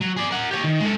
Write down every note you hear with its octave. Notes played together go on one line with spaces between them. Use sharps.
F#3
G#4 D5
A#4 F#5
G4 C#5
D#3
G#3 A4